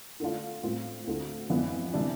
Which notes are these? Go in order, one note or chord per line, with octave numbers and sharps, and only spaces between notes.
D3 A3 D4 F4
A2 G3 C4 F4
D2 D3 A3 C4 F4
F2 E3 B3 D4 F4
C3 E3 G3 D4